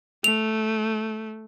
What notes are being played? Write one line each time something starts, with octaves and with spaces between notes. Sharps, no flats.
A3 F7